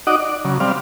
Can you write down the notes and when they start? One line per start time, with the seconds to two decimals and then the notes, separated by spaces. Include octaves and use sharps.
0.07 D#4 F#4 D5 D#5 F#5 D6
0.20 D5
0.45 C#3 F#3
0.60 G3 C4 D5 F5